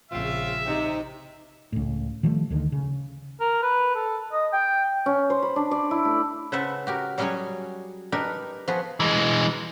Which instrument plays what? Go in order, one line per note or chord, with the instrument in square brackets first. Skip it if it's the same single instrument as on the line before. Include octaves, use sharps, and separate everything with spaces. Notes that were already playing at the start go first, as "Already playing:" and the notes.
[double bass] A#1 C#3 [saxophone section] C4 F4 [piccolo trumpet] E5
[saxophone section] C3 [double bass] D#4
[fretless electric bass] C#2 A2
D#3 F3 G3 A3
D2 D3 D#3
C#3
[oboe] A#4
B4
A4
D#5
G5
[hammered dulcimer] C#4
C5
B5
D4
D5
E4
A3
[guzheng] C#3 B4 C5 E5 F#5 A5
F#4 G4 A#4
F#3 G3 C#4 F#4 G#4 C#5
D4 D#4 G4 A#4 B4
F3 B3 F#4 G#4 B4
[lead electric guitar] E3 G#3